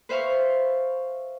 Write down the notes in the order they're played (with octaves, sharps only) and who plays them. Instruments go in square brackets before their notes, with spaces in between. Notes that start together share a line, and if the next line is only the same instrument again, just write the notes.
[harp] B4 C5 E5 F5 C#6